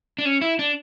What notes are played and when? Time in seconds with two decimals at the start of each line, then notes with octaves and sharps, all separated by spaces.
0.19 D4
0.25 C#4
0.41 E4
0.59 D4